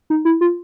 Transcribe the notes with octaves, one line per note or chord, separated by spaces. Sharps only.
D#4
E4
F4